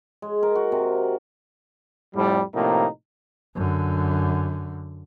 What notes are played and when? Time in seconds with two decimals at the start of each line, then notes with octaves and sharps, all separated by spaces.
0.22 G#3
0.43 A#4
0.55 F#4
0.72 C3
2.15 F2 A2 G3
2.54 A2 C3 F3 A#3 D#4
3.55 F#2 D3